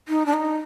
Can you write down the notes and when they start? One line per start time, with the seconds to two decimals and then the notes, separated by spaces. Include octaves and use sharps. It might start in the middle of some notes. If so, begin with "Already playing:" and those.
0.08 D#4
0.26 D4
0.33 D#4